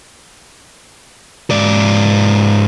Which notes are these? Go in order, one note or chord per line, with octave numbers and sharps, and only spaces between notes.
G#2 D5